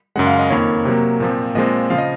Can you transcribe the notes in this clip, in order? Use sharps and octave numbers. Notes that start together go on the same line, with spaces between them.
F#2 C#3 G#3 F#5
F5
D#5
F2 D#3 A#3 C#5
C3 F#3 A#3
A#2 F3 C4
A#2 F3 G#3 C4 D#5
C#3 F3 F5
D#5